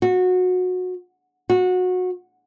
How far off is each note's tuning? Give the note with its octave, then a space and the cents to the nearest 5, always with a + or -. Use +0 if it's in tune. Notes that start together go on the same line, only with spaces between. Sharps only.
F#4 -20
F#4 -20